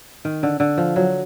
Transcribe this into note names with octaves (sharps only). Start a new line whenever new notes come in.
D#3
D3
D3
F3
F#3